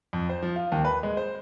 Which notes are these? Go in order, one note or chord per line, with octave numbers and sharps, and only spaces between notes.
F2
C5
F3
F4
D#2
B4
G#3
C5